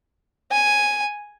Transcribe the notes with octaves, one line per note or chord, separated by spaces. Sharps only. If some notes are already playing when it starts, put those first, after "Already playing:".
G#5